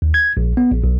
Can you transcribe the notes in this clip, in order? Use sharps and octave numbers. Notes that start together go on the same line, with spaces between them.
D#2
G#6
A#1
B3
A#1
B1